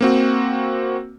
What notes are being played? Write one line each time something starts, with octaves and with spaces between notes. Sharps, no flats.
A#3 C4 F#4